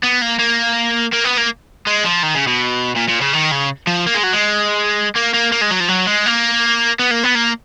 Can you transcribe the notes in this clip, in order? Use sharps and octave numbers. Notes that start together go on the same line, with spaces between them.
B3
A#3
A#3
A#3
B3
A#3
G#3
F3
D#3
C#3
B2
A#2
A#2
C#3
D#3
C#3
F3
A#3
G#3
F#3
G#3
A#3
A#3
A#3
G#3
F#3
F3
F#3
G#3
A#3
B3
A#3
B3
A#3